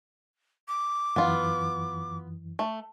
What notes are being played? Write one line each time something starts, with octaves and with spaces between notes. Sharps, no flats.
D6
F#2 E3 B3 F4
A3